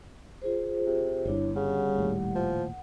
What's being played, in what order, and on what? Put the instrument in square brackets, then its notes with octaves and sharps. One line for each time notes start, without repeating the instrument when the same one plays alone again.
[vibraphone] F4 G#4 C5
[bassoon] C3
[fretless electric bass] G1 G2 [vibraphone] D4 E4 C#5
[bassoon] C#3 [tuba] G3 [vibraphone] F#5
[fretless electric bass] D#1 D#2 A2
[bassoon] F3